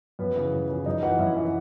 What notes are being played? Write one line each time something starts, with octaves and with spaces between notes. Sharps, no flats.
F#2 B3 B4
C#3 E3
F#2
C#3 E3
F#2 D#4 D#5
E3 F#4 F#5
F#2 E4 E5
E3